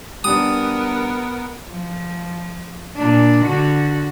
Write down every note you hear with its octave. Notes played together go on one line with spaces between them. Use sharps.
G3 B3 D4 A#4 D#6
F3
A#2 D4
D3 F#4